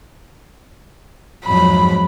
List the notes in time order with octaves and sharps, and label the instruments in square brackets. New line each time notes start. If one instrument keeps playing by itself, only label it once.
[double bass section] F2 G#2 F#3 [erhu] B5